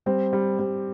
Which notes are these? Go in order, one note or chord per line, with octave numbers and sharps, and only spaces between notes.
G3 C4
G3
G3